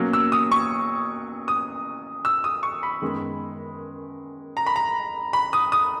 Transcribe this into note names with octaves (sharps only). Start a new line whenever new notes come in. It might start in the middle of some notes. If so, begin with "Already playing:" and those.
Already playing: B2 F#3 A#3 C#4
E6
D#6
C#6
D#6
E6
D#6
C#6
B5
F#2 D#3 G#3 B3
A#5
B5
A#5
B5
D#6
D#6